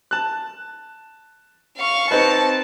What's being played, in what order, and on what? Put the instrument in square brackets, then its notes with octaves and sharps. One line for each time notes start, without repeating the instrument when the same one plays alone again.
[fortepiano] A5 F#6
[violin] F5 C#6
[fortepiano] C4 D#4 B4 [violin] A5